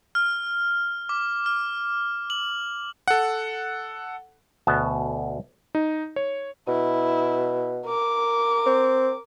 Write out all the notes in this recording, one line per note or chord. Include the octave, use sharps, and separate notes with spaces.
F6
D6
F6
F#7
A4 F#5
D2 B2 B3 A5
D#4
C#5
B2 E4
A#4 D6
C4